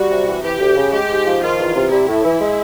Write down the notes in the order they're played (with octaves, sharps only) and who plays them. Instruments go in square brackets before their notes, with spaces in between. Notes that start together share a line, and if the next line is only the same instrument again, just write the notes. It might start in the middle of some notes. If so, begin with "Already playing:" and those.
Already playing: [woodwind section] G3 [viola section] F#4
[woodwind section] C3
E3
[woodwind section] E3 [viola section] G4
[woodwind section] D2
C#3
[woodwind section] G#3 [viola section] G4
[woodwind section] G#2
F3
[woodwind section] D#3 [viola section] F4
[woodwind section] E2
C3
[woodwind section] G3 [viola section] E4
[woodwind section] A2
E3
G#3